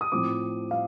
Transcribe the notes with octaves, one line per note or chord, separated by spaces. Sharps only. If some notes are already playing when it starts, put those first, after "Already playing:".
D#6
A2 F3 C4 D6
A2 F5